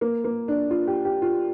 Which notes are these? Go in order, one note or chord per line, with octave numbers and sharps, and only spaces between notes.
A#3
A#3
D4
F4
G4
G4
F4